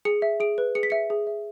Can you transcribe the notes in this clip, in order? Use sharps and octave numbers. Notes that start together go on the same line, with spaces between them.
G#4 C#7
E5
G#4 D7
B4
G#4 C#7
B6
E5 C#7
G#4
E5